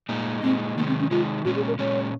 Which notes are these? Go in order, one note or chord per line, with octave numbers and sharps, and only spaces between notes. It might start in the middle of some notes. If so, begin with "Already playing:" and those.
A#2 G#3 D#4
A#2 G#3 C4 D#4
C3 D#3 G#3 A#3 D#4
C4
C#4
C3 D#3 G#3 D#4 F4
A#2 G#3 C#4 F#4
G#4
A#4
A#2 G#3 C#4 C#5